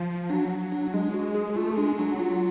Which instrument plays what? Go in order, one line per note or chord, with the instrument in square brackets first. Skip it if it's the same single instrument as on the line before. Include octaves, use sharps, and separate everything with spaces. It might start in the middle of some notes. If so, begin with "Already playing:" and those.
Already playing: [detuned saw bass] F3
[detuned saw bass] F#3 [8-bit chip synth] D4
[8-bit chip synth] D4
[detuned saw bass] G#3 [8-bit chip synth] D4
[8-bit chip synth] F#4
G#4
[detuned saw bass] A3 [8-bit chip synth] F4
[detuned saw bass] G#3 [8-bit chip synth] D4
[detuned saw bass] F#3 [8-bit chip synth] D4
[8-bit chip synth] F4